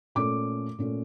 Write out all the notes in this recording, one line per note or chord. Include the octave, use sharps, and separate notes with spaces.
A#2 A3 C#4 D6
A#2 A3 C#4